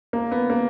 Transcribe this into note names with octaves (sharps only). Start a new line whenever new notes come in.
A#3
B3
A#3